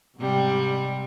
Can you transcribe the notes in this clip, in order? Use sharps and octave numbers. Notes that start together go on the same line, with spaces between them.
G#2 C3 G3